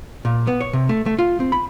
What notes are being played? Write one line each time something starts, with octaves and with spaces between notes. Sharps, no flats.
A#2
B3
C#5
C3
A3
A3
F4
C4
B5